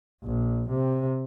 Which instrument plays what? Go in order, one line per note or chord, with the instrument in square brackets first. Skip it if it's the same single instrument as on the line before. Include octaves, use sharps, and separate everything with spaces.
[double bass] A#1
C3